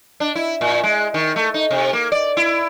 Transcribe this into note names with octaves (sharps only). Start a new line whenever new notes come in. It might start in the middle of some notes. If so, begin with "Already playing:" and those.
D4
E4
A#2
G#3
D#3
A3
D#4
C3
A#3
D5
E4